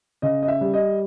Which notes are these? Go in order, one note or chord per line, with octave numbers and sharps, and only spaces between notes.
C#3 D#5
D#5
E5
G3
D#5